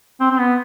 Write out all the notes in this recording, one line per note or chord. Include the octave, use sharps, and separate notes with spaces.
C4
C4
B3